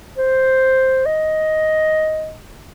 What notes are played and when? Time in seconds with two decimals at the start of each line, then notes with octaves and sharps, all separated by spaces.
0.18 C5
1.06 D#5